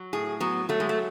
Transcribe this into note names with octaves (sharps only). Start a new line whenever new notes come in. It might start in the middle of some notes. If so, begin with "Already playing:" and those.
Already playing: F#3
A2 G#4
F#3 B3
F#3 A3
G#3
A3